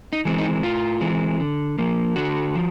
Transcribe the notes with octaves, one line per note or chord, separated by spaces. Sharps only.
D#4
E3 G#3 C4
D#4
A2 F4
E3 G#3 C4
D3
F3 A#3
D3 F#4
F3